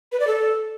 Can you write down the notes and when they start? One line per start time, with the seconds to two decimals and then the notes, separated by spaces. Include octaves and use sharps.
0.12 B4
0.20 D5
0.27 A4